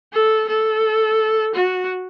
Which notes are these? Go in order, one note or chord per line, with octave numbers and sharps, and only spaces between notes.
A4
A4
F#4